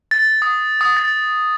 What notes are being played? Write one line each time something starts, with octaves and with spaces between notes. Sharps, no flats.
A6
D#6
D#6
A6